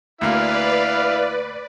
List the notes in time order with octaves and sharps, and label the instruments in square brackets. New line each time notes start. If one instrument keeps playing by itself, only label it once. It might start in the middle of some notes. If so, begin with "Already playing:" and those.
[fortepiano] D2 A#3 [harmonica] E4 F5 [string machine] B4 D5